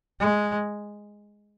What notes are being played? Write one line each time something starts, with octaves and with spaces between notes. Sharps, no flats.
G#3